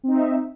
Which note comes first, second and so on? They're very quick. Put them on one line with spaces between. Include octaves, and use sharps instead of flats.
C4 D#4 E5